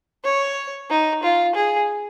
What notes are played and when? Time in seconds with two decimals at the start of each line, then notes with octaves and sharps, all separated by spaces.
0.24 C#5
0.90 D#4
1.23 F4
1.56 G#4